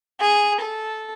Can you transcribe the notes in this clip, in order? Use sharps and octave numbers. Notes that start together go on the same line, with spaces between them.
G#4
A4